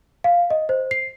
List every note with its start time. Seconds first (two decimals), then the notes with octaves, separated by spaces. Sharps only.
0.24 F5
0.50 D#5
0.69 C5
0.91 C7